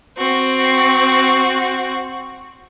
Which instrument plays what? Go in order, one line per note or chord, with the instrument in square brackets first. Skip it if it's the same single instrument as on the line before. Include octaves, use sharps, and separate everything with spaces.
[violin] C4 F#4